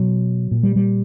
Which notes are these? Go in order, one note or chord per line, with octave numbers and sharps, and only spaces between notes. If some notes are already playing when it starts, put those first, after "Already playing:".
Already playing: B2 F#3
A#2
G3
G3